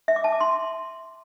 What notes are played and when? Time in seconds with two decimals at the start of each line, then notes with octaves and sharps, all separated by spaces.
0.08 E5
0.16 D6
0.24 A5
0.32 D6
0.40 C6